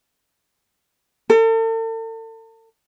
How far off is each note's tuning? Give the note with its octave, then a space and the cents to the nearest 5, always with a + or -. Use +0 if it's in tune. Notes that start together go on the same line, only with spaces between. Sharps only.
A4 +40